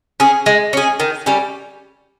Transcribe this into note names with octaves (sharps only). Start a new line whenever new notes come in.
C#4 G#4
G#3
C#4 G#4
D#3
G3 C#4